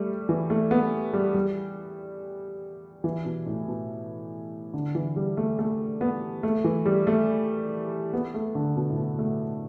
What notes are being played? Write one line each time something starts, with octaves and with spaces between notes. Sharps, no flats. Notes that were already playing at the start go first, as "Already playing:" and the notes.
Already playing: G3 A3
E3
A3
B3
G3
G3
E3
B2
A2
B2
D3
E3
G3
A3
A3
B3
A3
E3
G3
A3
B3
A3
D3
B2
A2
B2
A3